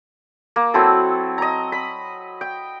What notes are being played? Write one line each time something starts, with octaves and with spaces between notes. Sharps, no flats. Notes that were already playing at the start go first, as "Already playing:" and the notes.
A#3
F#3 C4 E4 A4
D#5 A#5
B5
G5